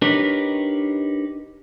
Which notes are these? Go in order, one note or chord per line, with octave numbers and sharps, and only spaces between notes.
D4 D#4 G4 A#4 B4 C#5